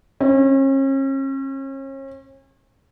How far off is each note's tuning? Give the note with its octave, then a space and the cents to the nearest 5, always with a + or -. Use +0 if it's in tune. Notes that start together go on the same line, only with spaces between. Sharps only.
C#4 -40